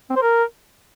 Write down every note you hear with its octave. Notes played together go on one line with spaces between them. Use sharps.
C4
C5
A#4